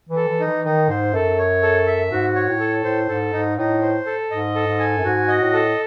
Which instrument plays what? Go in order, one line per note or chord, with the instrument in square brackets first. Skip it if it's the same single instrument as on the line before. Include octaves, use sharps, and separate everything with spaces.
[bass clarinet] E3
[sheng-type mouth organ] A4
[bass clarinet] E3
[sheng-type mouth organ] D#4
[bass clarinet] E3
[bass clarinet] D#3 [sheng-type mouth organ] D#4
[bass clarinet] G#2 [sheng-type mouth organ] C5
[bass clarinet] F#2 [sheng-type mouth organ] A4
[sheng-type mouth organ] C#5
A4
E5
[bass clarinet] G#2 [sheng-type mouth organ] F#4
[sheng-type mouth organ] C#5
[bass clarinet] A2
[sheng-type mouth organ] A4
[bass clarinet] A2 [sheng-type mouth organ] C5
[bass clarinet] G#2 [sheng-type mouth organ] A4
[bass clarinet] G#2 [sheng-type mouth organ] D#4
[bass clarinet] A2 [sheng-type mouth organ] D#4
[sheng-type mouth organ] C5
A4
[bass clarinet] G#2 [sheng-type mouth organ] D#5
[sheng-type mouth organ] A4
[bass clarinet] G#2
[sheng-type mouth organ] G#5
[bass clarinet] F#2
[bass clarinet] G#2 [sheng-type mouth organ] F#4
[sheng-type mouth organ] D#5
[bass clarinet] A2
[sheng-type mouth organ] A4